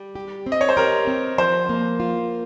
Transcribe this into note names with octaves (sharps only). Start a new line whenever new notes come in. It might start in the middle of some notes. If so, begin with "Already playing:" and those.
Already playing: G3
G4
C4
D#5
C#5
C5
G4 A#4
C4
F3 C5
A#3
F4